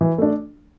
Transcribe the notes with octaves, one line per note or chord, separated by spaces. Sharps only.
E3
A3 D4